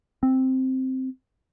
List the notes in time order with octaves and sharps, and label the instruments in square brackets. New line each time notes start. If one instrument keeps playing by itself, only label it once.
[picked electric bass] C4